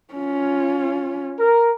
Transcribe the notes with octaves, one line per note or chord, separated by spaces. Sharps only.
C#4 F4
A#4